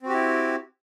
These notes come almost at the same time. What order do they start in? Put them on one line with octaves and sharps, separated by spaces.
C4 F#4 G4 E4